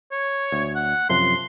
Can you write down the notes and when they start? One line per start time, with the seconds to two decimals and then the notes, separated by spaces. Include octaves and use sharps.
0.12 C#5
0.52 D2
0.75 F#5
1.09 F#2 C3 F3 C6